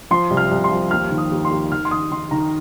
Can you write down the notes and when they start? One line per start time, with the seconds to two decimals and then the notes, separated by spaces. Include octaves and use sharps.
0.11 F3 C6
0.31 C2
0.37 F6
0.51 C2
0.64 C6
0.71 F3
0.91 D#2 F6
1.11 D#3
1.18 D#6
1.31 D#2
1.45 C6
1.51 D#2
1.72 D#3 F6
1.85 C6
1.91 D#3 D#6
2.11 D#3 C6
2.31 D#3 A#5